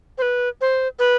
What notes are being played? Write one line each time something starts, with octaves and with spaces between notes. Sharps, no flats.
C5
B4
C5
B4